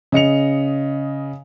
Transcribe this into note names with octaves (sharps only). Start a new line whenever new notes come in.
C#3 D#5 C#7 F7